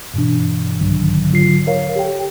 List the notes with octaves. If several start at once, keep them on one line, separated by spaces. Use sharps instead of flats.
G2 B2 E3 D4
B1 G#2 D3 D#3 F#3
D3 F#3 F4 C7
A#4 C#5 F5
G4 A4 G5